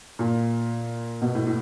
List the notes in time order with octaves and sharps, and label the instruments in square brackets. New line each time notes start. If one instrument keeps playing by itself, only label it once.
[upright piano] A#2
B2
A2
A2